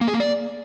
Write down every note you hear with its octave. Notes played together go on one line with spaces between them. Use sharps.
A#3
G#4
A#3
D5